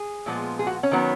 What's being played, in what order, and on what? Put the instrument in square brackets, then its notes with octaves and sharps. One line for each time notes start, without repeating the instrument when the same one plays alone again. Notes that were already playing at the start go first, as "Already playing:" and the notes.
Already playing: [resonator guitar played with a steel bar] G#4
A#2 F3 G#3 B3
G#4
F#4
C#4
D#3 F#3 B3